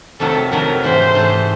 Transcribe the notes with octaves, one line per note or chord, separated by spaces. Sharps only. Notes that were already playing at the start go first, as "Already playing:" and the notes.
F2 C3 D#3 F#3 A3 A4
F2 C3 D#3 F#3 A3 A#4
G#2 E3 A3 C5
G#2 E3 A3